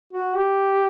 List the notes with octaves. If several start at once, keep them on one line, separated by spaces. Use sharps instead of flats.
F#4
G4